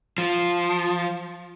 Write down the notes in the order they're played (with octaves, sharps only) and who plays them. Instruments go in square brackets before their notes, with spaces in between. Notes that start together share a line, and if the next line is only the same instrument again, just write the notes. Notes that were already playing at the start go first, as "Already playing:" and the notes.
[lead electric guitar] F3